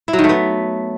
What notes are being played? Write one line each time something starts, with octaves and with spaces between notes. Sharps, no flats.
E4
F#3
D#3
A3
B3